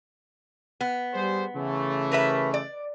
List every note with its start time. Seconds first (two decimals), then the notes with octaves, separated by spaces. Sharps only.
0.81 B3
1.15 G3 G#4 C5
1.56 C#3 E3 A3
2.12 A#4 B4 E5
2.54 D5